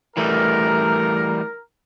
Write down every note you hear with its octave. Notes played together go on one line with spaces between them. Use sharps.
E3 G3 A3 A#4